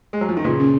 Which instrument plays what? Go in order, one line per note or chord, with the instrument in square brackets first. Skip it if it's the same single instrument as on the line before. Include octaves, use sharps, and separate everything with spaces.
[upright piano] G#3
F#3
F3
D#3
[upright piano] A#2 C#3 [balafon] B4
[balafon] C#4